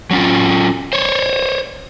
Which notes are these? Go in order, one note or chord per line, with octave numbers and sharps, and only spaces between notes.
F#3 C#4 F4
C5 C#5